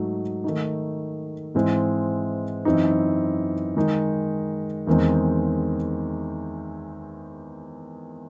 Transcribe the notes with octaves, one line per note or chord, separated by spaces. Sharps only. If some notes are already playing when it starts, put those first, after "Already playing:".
Already playing: G#2 F#3 A3 D#4
D#3 A3 D#4
G#2 E3 G#3 C4 E4
F#2 E3 C4 D#4
D#3 G#3 D#4
E2 D#3 G#3 C4 D#4